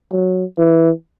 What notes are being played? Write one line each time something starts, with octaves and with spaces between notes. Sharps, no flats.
F#3
E3